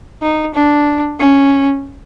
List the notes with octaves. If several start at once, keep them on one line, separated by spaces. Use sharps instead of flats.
D#4
D4
C#4